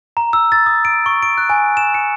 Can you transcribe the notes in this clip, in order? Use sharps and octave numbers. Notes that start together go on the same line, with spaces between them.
A#5
E6
A6
D#6
D7
C#6
D7
F#6
G#5
E7
C#7